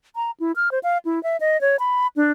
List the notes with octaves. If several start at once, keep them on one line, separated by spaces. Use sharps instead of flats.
A#5
E4
F6
C5
F5
E4
E5
D#5
C#5
B5
D4